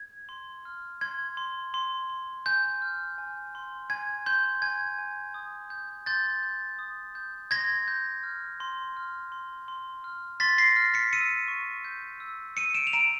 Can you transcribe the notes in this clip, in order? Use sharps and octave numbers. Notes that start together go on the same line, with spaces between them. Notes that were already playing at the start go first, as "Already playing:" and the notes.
Already playing: G#6
C6
F6
C6 G#6
C6
C6
C6
G#5 G6
F6
G#5
C6
G#5 G#6
C6 G6
G#5 G#6
G#5
D#6
G6
C6 G6 A6
G6
D#6
G6
C6 G#6 A#6
G6
F6
C6
F6
C6
C6
F6
C6 A6 B6
A#6 C7
F6
B6 C#7
E6 C#7 D#7
C#6
G6
E6
E6 C#7 D#7
D7 E7
F7
A#5 D7 E7